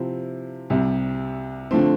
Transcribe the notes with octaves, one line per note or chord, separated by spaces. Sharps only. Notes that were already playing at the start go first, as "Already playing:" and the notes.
Already playing: C3 F3 C4 E4
C2 C3 G3
D3 F3 A3 C4